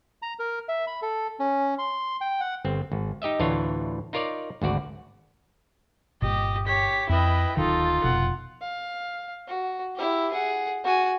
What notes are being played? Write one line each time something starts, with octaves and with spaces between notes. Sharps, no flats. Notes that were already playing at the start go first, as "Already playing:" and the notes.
A#5
A#4
E5
B5
A4
C#4
C6
G5
F#5
G1 C4
G#1
D#4 G4 D#5 E5
D2 A2 E3 D4 F4 C#5
D#4 F4 A#4 C#5 D5
G#1 D2 F#4 D5
G1 A#2 G4 D#5
G4 C#5 B6
F2 E4 B4 D#5 G5
D1 D#3 D#4 F4 A4
F1 B2 F#5
F5
F#4
E4 G4
G#4 F#5
F#4 G#5